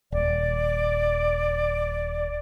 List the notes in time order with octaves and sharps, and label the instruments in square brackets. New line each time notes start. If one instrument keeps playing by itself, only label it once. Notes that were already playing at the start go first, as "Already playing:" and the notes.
[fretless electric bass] D#1 [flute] D5